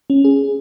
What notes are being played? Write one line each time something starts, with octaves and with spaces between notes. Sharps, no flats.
C#4
G#4